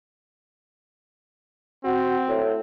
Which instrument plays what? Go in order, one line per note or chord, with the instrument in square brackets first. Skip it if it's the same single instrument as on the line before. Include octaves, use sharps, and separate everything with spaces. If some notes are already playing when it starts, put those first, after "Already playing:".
[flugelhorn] C4 [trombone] F#4
[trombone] A2